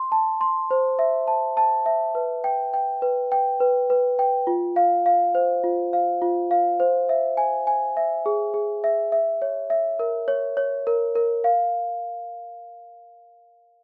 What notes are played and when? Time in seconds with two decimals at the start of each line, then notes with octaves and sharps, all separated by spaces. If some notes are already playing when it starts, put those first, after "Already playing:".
Already playing: C6
0.12 A5
0.41 C6
0.71 C5
0.99 E5
1.28 A5
1.57 A5
1.86 E5
2.15 B4
2.44 G5
2.74 G5
3.02 B4
3.32 G5
3.60 B4
3.90 B4
4.19 G5
4.47 F4
4.76 F5
5.06 F5
5.35 C5
5.64 F4
5.93 F5
6.22 F4
6.51 F5
6.80 C5
7.09 E5
7.37 G#5
7.67 G#5
7.97 E5
8.26 G#4
8.54 G#4
8.84 E5
9.12 E5
9.42 C#5
9.70 E5
9.99 A#4
10.28 C#5
10.57 C#5
10.87 A#4
11.15 A#4
11.44 F5